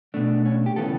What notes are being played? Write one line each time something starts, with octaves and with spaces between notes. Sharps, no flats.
B2 A3 D4
C#4
G4
C#3 E3 B3 A4